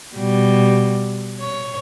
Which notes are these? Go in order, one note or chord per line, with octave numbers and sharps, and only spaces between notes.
B2 G3
C#5